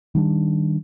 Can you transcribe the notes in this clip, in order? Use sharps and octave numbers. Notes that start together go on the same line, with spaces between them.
D#3 G3 D4